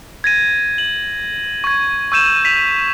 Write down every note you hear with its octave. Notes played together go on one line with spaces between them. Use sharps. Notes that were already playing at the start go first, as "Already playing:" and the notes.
G#6 A#6 D#7
F#7
C#6 G#6
C#6 E6 G6 D#7 E7
B6 F7